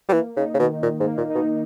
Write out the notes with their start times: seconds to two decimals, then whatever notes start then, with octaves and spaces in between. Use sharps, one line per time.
0.09 G3
0.13 E3 A#3
0.36 C#3 D#4
0.54 C#3
0.59 B2 D#3
0.82 A#2 D#3
1.00 G#2
1.05 A#3
1.17 A#2
1.30 D#4
1.35 B2